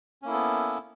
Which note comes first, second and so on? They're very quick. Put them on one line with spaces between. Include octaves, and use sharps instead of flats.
C#4 A#3 E4 A4 B3